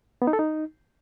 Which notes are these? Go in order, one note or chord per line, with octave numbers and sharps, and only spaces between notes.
B3
D#4
A4
D#4